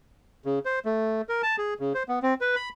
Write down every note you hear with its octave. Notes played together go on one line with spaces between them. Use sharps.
C#3
C5
A3
A#4
A5
G#4
C#3
C5
B3
C4
B4
B5